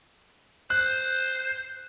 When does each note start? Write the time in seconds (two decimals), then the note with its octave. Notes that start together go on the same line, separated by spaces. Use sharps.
0.70 C5 F#6